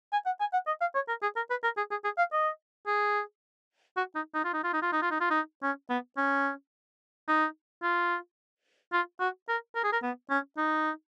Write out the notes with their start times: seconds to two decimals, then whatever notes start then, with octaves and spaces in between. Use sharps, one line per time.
0.12 G#5
0.26 F#5
0.40 G#5
0.53 F#5
0.67 D#5
0.81 F5
0.95 C#5
1.08 A#4
1.22 G#4
1.36 A#4
1.50 B4
1.63 A#4
1.77 G#4
1.91 G#4
2.04 G#4
2.18 F5
2.32 D#5
2.87 G#4
3.97 F#4
4.15 D#4
4.34 D#4
4.44 F4
4.53 D#4
4.63 F4
4.73 D#4
4.82 F4
4.92 D#4
5.02 F4
5.11 D#4
5.20 F4
5.30 D#4
5.63 C#4
5.89 B3
6.17 C#4
7.28 D#4
7.82 F4
8.92 F4
9.20 F#4
9.48 A#4
9.75 A#4
9.83 G#4
9.92 A#4
10.02 B3
10.30 C#4
10.57 D#4